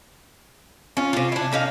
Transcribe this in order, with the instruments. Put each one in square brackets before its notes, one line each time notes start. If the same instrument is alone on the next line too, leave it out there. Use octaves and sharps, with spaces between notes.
[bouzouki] C#4 F4
C3 F4
D4 E4
A3 C#4 D#4 F5